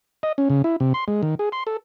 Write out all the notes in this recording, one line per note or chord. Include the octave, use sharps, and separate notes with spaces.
D#5
C#4
C#3
E4
C3
C6
G#3
D#3
G#4
C6
A4